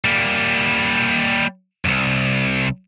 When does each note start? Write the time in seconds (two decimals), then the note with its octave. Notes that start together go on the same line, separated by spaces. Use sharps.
0.05 G3 A#3
1.85 C2 G2